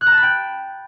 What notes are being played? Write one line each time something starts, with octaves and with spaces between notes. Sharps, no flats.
F#6
A#5
A5
B5
G5